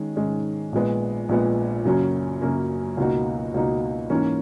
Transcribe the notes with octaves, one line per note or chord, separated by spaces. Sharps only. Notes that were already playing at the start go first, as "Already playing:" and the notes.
Already playing: D#3 G#3 C#4
G#2 D#3 G#3 C#4
A#1 A#2 G#3 B3
A#1 A#2 G#3 B3
F#2 C#3 F#3 A#3 C#4
F#2 C#3 F#3 A#3 C#4
C#2 B2 A#3 D#4 F#4
C#2 B2 A#3 D#4 F#4
G#2 E3 A#3 C#4